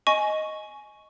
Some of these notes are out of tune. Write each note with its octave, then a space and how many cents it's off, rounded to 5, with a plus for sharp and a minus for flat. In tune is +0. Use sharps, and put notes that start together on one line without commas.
D#5 +0 G#5 +15 C#6 +0